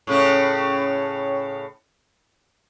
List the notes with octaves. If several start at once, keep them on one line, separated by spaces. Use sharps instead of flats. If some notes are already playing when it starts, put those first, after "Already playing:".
A2 C#3 C#4